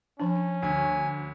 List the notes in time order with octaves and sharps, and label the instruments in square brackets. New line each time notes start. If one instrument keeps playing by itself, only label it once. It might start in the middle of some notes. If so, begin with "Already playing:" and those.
[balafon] F3 D4 [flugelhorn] C#4
[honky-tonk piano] D2 [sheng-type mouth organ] G#5